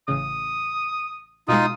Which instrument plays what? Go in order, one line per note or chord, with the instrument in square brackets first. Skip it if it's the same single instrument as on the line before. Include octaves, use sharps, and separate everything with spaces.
[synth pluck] A1 C#3 [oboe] D#6
[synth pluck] B2 G#3 [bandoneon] D#4 F4 [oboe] D#6